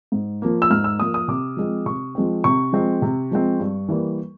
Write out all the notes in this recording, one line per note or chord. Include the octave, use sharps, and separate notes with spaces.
G#2
F3 A#3
E6
G#2 F6
E6
F3 A#3 D#6
D#6
C3 D6
F3 G#3 C4
C3 C#6
F3 G#3 C4
C3 C#6
F3 G#3 C4
C3
F3 G#3 C4
G2
E3 G3 A#3